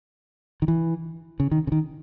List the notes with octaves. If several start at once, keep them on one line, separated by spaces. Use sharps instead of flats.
D#3
E3
C#3
D#3
C#3
D#3